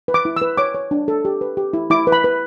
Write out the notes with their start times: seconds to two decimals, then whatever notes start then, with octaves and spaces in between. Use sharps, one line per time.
0.08 B4
0.14 D6
0.25 E4
0.36 E6
0.42 B4
0.58 C#5 D6
0.75 C#5
0.91 D4
1.08 A4
1.25 G4
1.41 B4
1.57 G4
1.73 E4
1.90 E4 D6
2.07 B4
2.12 B5
2.24 B4